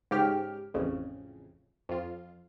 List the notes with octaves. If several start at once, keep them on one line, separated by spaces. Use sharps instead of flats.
G#2 C#3 G4 F6
A1 F2 C#3
F2 F4